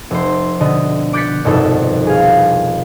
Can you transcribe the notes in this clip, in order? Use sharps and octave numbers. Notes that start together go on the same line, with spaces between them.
F1 C5
B2 D3 B3 D#5
D6 F#6 G6 A6 B6 C#7
G1 C2 F2 B2 D#4 A4
G#4 F5